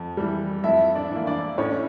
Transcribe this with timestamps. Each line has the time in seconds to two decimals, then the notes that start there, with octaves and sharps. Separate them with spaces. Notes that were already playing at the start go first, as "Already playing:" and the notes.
Already playing: F2
0.17 E3 G3
0.64 F2 E4 E5
0.95 D4 D5
1.11 E3 A#3
1.27 D4 D5
1.58 A2 C#4 C#5